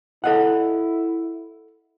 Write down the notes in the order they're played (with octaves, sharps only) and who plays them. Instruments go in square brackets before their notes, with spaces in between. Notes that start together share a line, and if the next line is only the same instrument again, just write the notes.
[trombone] E4 [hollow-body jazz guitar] A4 D#5 F#5